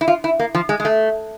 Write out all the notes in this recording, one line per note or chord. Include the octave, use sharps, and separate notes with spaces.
E4
F4
E4
A#3
F3
G#3
G#3
A3